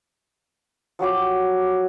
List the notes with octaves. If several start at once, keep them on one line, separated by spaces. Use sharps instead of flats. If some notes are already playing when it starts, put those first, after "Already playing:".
F3 F#3 G4 D6